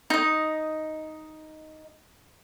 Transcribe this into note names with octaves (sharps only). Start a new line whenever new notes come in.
D#4 D#5